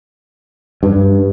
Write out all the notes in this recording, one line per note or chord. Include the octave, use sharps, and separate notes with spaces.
G2